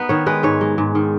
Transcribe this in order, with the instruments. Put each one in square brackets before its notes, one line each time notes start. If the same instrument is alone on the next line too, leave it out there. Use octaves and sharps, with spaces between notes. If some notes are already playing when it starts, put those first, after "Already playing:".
Already playing: [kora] B3 D#4 B4
D#3 C#5
G#3 B4
G#2 C#5
G#3
G#2
D#3